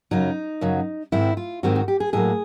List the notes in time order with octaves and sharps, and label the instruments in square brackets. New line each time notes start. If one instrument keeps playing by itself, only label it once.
[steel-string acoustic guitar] F#2 C#3 F#3 D#4
F#2 C#3 F#3
G#2 D#3 G#3 C4 E4
F4
G#2 D#3 G#3 C4 F#4
F#4
G4
G#4
A2 F#3 A#3 G#4